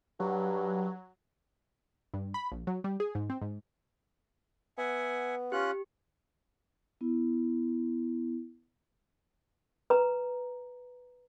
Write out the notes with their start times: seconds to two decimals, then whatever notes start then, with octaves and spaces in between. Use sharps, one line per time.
0.20 G2 F#3
2.14 G2
2.34 B5
2.52 A#1
2.67 F#3
2.84 G3
3.00 G#4
3.15 G#2
3.30 C4
3.42 G#2
4.78 B3 E5 F#5 G#5
5.52 C#4 F4 G4 F#6
7.01 B3 E4
9.90 B4 A#5